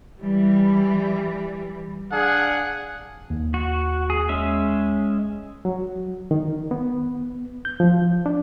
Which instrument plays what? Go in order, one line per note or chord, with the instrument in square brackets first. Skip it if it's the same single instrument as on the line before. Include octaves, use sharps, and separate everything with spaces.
[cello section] E3 G3
[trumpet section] D4 G#4 F5 F#5
[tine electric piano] D#2
[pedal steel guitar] F#4
G#4
G#3 C#4 E5
[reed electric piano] F#3
D#3
B3
G6
F3
D4